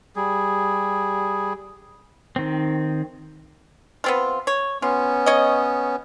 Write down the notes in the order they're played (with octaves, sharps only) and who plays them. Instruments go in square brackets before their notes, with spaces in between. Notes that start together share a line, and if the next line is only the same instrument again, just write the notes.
[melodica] G3 G#4
[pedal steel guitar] D#3 C4
[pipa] B3 C4 F4
C#5
[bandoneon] B3 C#4 [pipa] F4
[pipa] C#5 D#5